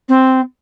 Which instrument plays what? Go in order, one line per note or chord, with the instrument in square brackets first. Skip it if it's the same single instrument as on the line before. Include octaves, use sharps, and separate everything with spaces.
[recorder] C4